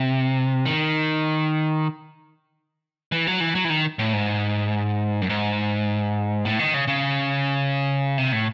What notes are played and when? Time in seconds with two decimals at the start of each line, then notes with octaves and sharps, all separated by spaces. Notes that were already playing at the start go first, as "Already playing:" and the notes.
Already playing: C3
0.66 D#3
3.12 E3
3.27 F#3
3.40 E3
3.55 F#3
3.64 E3
3.70 D#3
3.99 A2
4.13 G#2
5.22 F#2
5.30 G#2
6.45 A2
6.59 D#3
6.74 C#3
6.88 C#3
8.18 C3
8.32 A2